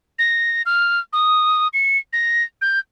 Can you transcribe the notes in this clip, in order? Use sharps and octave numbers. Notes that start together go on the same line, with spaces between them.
A#6
F6
D#6
C#7
A#6
G6